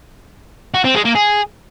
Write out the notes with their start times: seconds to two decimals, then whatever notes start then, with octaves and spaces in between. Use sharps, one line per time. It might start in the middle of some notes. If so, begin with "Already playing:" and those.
0.74 F#4
0.84 C4
0.95 G#3
1.05 A#3
1.15 G#4